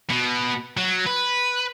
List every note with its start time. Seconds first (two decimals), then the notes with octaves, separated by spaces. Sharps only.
0.10 B2
0.77 F#3
1.06 B4